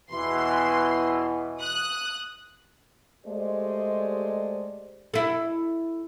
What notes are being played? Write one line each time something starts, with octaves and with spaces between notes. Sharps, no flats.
E2 B2 E3 C6
D#6 F#6
G#3 A3 G4 C5 D5 D#5
E4 A4